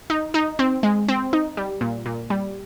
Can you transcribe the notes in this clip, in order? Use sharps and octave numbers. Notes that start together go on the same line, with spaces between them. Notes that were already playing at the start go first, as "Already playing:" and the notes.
D#4
D#4
C4
G#3
C4
D#4
G3
A#2
A#2
G3